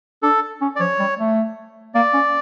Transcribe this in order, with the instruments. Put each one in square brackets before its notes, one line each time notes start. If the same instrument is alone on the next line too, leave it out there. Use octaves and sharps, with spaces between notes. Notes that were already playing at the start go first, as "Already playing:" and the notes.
[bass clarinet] D4 [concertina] A4
[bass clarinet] C#4
[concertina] D5
[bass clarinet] F3 [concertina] C#5
[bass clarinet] G3
A3
[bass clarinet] A#3 [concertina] D5
[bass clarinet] C#4